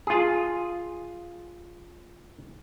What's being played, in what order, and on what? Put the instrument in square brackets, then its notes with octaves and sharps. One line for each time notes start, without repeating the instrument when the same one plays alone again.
[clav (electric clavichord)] F4 G#4